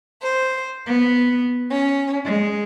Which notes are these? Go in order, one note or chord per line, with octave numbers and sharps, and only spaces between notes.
C5
B3
C#4
G#3